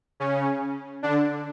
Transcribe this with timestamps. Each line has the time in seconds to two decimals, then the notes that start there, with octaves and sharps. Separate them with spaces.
0.20 C#3 C#4
1.03 D3 D4